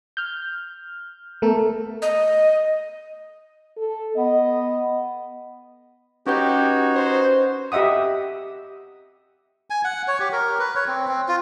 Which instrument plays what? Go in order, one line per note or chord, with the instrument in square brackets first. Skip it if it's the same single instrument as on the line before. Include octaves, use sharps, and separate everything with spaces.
[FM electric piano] F6 G6
A3 B3 A4 A#4
[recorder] D#5
[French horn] A4
[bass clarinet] B3 [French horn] D#5
[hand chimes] C#4 B4 G6 [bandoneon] D#4 F#4 C#5 [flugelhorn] G4
[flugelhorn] C5
[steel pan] G4 D#5 E5 F#5 D#6
[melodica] G#5
F#5
C#5
G4
A#4
B4
C#5
C4
C4
F4